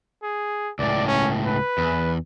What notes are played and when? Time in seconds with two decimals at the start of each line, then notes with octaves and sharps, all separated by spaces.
0.23 G#4
0.79 C#2 A2 D5
1.07 C#4
1.46 B4
1.78 E2